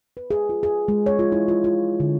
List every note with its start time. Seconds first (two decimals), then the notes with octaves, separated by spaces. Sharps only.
0.17 B4
0.31 G#4
0.49 F4
0.63 G#4
0.88 G#3
1.06 C#5
1.19 F4
1.32 E4
1.48 F4
1.64 F4
2.00 D3